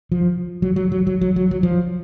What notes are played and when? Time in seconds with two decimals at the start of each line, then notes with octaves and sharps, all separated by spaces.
0.12 F3
0.62 F#3
0.76 F#3
0.92 F#3
1.07 F#3
1.21 F#3
1.36 F#3
1.51 F#3
1.63 F3